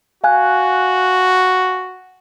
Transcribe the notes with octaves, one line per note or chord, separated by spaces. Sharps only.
F#4 F5 G#5 F#6